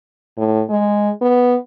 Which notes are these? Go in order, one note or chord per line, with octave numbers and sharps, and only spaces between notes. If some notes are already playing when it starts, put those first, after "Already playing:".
A2
G#3
B3